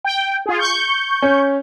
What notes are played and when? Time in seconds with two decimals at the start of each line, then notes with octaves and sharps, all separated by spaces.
0.05 G5
0.46 F4 G#4
0.59 C#6 G6
1.22 C#4